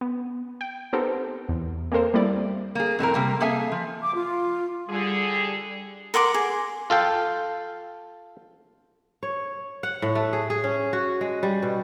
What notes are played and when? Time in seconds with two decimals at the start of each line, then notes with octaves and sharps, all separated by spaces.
0.01 B3
0.61 G5
0.93 B3 C4 D#4 G4 A4 A#4
1.49 E2
1.92 A#3 C4 A4 A#4 C5
2.14 G3 A3 A#3 C4 E4 D5
2.75 A#3 G#4
2.99 F2 A2 C4 A#4
3.14 C3 G3 A#3
3.40 A#3 G#4 A4 E5 G#5
3.72 F3
4.01 D6
4.13 F4
4.89 D3 G3 G#4
6.14 A#4 F#5 C6 D6
6.34 G#4
6.90 F4 A4 F5 G5
9.23 C#5
9.83 F#5
10.02 A2
10.15 A3
10.33 G#4
10.50 G#4
10.64 C#4
10.93 F#4
11.21 G#3
11.43 G3
11.62 B2